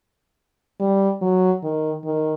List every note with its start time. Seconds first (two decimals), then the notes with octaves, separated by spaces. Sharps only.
0.80 G3
1.22 F#3
1.63 D#3
2.04 D#3